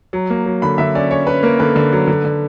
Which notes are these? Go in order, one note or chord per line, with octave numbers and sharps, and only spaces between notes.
F#3
A#3
F#3
D3 B5
D3 E5
C#4 D5
C#4 C#5
C#4 B4
A#3 A#4
D3 B4
D3
F#3
D3
D3